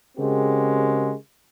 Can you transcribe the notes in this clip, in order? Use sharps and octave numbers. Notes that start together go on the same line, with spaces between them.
C#3 G#3 C4 F#4 G4 A#4